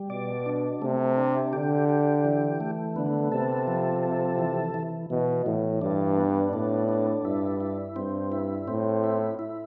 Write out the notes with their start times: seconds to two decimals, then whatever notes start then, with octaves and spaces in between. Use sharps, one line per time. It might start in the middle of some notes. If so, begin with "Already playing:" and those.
Already playing: G3
0.10 B2 D5
0.46 D4
0.82 C3 A3
1.17 D4
1.53 D3 G4
1.89 G4
2.25 E3
2.60 A3
2.96 D3 B3
3.31 C3 A4
3.67 F3
4.03 A4
4.39 E3
4.74 E3
5.10 B2 E3
5.46 A2 E3
5.81 G2 D4
6.18 B3
6.53 A2 D4
6.89 D4
7.24 G2 E4
7.60 E4
7.96 G2 C4
8.32 E4
8.68 A2 C4
9.04 E4
9.39 E4